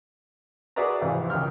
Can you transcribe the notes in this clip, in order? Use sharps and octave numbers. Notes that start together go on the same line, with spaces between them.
F#4 G#4 B4 D5 E5 A#5
F2 G#2 C3 E3
C#2 D#3 G5 F6